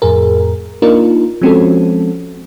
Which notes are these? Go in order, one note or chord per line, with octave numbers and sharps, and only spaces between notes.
F2 A2 G#4 A#4
A#3 D4 D#4 F4 A#4
F3 G#3 C4 C#4 F#4 A4